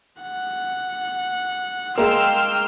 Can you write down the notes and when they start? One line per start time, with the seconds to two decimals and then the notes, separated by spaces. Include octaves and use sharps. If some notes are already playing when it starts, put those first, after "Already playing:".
0.21 F#5
1.98 G#3 A#3 G5 C6 E6 F6